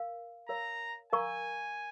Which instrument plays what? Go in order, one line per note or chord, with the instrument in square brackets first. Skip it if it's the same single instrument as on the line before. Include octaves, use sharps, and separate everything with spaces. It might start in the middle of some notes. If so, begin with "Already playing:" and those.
Already playing: [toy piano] A#4 F5
[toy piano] A#4 C#5 F5 [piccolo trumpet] A#5
[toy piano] A#4 F5 A#5 C#6 [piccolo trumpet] G#5